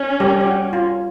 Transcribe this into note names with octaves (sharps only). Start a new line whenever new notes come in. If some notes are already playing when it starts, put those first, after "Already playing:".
Already playing: C#4
G3 G4
G4
F#4
F4